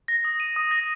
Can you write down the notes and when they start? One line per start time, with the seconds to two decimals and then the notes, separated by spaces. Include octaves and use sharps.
0.08 A#6
0.25 D#6
0.40 D#7
0.56 D#6
0.71 A#6